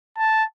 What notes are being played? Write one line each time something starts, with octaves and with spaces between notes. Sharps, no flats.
A5